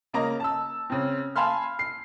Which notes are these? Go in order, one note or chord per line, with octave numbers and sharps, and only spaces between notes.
C#3 A#3 D#5 A#5
A5 E6
C#3 C4
F5 G#5 A5 B5 C6 F6
C7